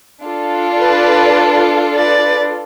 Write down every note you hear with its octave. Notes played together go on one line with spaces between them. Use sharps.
D4 F4 A4
B4 D5
B4 D5